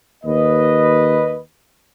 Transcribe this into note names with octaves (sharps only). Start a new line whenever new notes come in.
D#2 B4 D#5